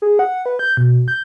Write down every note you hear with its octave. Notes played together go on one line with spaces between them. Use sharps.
G#4
F#5
B4
G6
B2
G6